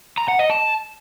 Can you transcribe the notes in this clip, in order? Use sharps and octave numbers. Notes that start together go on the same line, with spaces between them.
A#5
F#5
D#5
A5